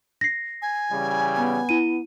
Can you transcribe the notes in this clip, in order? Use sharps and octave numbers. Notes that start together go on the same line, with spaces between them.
A#6 C7
G#5
C#3 E3 G3
B3
E4 D#7